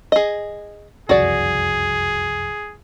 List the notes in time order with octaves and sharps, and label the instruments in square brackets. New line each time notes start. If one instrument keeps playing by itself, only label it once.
[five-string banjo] G#4 D#5
[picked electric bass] F#1 C2 F2 [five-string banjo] F#4 D5 [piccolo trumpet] G#4